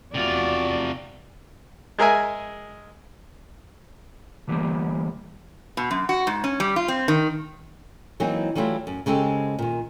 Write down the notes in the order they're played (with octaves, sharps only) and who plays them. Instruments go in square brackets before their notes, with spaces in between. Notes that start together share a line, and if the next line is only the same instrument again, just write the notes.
[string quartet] E2 F#4 [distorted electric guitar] C3 F4 [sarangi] D5
[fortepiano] G#3 G#4 A#4 E5 G#5
[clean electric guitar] D3 E3 G3 A#3
[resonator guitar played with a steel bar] B2
F#2
F#4
G#2
C#4
G3
F4
C4
D#3
[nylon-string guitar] E3 F#3 A#3 C4 D#4
E3 F#3 G3 A3 E4 F4
F#2
C#3 G#3 C4 G4 A4
A#2 D#3